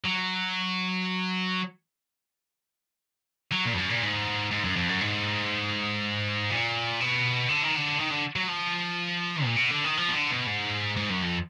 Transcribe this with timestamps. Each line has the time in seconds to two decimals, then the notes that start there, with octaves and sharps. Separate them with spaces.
0.05 F#3
3.52 F#3
3.66 A#2
3.74 F2
3.78 F#2
3.90 A#2
4.03 G#2
4.51 G#2
4.64 F#2
4.76 F2
4.89 F#2
5.01 G#2
6.50 A#2
7.00 B2
7.49 D3
7.63 D#3
7.76 D3
7.99 D#3
8.11 D3
8.36 F#3
8.48 F3
9.44 A#2
9.56 B2
9.70 D3
9.84 D#3
9.97 F3
10.08 B2
10.13 D3
10.31 B2
10.47 G#2
10.97 G#2
11.10 F#2
11.22 F2